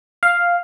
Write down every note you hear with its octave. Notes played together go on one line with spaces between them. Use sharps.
F5